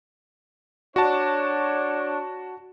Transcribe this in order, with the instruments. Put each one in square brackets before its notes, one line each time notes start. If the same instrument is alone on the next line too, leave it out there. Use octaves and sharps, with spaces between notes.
[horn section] D4 C#5 [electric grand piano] F#4 A5